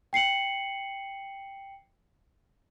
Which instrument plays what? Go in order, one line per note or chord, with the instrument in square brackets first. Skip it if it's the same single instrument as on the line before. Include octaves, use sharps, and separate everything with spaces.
[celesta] G5 C7 C#7 F#7